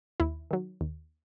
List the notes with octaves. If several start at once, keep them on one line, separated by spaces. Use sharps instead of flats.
D#2 E4
D#3 F#3
D#2